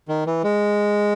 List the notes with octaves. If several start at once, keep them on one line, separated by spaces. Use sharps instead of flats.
D#3
E3
G#3